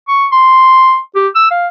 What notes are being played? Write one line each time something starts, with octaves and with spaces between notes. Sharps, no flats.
C#6
C6
G4
E6
F5